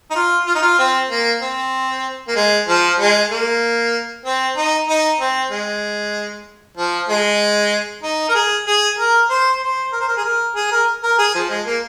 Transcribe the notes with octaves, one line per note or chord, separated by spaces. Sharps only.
D#4
F4
F4
D#4
F4
C4
A#3
C4
A#3
G#3
F3
G#3
A#3
C4
D#4
D#4
C4
G#3
F3
G#3
D#4
A#4
G#4
G#4
A#4
C5
C5
A#4
C5
A#4
G#4
A#4
G#4
A#4
A#4
G#4
F3
G#3
A#3